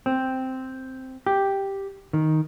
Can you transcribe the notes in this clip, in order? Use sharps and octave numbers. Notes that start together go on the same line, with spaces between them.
C4
G4
D#3